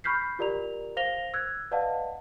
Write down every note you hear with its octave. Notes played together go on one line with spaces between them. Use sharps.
B5 C#6 F6 G6 B6 C7
F4 G4 A#4 D5 A#5 F7
C5 F5 A#6 F7 G7
E6 F#6 G#6
B4 D5 D#5 F5 F#5 A5